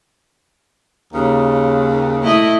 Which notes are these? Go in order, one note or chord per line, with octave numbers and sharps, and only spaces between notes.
D#2 C#3
A3 E4 D#5